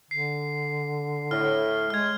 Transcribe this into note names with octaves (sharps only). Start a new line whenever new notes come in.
D3 C7
A2 F6
G#3 F6 G#6